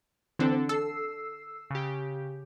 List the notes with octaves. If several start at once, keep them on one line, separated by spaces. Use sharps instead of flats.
D3 E3 C4 D4 A4
A4 E6 C7
C#3 G4